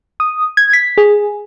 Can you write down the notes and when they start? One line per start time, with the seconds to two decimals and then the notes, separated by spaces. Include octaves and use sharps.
0.20 D#6
0.57 G#6
0.73 B6
0.98 G#4